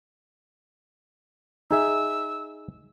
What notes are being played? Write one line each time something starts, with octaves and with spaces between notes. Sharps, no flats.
D#4 G#4 E5 E6